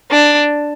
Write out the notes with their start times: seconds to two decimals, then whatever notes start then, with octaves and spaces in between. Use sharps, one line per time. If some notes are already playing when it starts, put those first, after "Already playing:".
0.11 D4